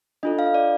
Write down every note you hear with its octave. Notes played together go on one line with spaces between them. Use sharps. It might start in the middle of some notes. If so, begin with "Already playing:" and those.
D4 F4 A4 D#5
F5
D5